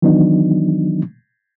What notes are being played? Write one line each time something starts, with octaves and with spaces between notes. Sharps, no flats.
D#3 E3 F#3 B3 D4 D#4